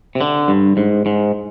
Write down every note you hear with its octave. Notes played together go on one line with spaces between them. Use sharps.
C3
D3
G2
G#2
G#2